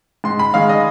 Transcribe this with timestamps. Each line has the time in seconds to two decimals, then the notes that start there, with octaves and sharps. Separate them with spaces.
0.24 G#2 C6
0.39 B5
0.54 D#3 G#3 F5
0.69 D#5